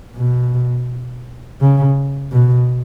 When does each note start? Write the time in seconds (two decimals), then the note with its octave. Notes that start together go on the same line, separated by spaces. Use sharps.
0.17 B2
1.61 C#3
2.32 B2